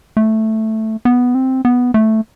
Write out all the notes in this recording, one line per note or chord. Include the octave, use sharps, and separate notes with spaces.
A3
B3
C4
B3
A3